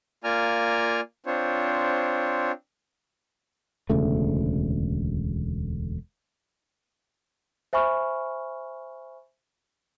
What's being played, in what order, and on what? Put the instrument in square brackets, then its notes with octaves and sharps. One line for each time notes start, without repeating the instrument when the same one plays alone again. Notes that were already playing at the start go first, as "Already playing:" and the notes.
[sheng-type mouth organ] A#3 F4 D5 G#5 A#5 F6
C4 D4 F4 C5 C#5
[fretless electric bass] E1 D2 C#3 A3
[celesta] C5 E5 G#5 B5 C#6 F6